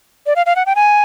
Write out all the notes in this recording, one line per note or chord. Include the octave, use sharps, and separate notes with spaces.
D5
F5
F5
F#5
G5
G#5